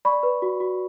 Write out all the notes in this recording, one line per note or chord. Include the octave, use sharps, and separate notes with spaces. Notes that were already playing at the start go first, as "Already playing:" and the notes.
D5 B5 C#6
B4
F#4
F#4